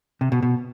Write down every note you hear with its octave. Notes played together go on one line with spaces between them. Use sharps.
C3
B2
B2